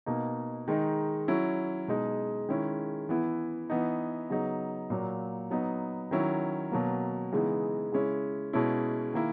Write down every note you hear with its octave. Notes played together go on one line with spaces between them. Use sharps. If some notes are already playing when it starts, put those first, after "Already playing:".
B2 A#3 D#4
D#3 G#3 D#4
F#3 C#4 E4
B2 G#3 D#4
D#3 G#3 C#4 E4
E3 B3 E4
E3 B3 D#4
C#3 F#3 B3 D#4
A#2 F#3 A#3
F#3 B3 D#4
D#3 F#3 C#4 E4
B2 F#3 A#3
C#3 E3 G#3 B3 D#4
C#3 G#3 C#4 E4
B2 G#3 C#4 E4
D#3 A#3 E4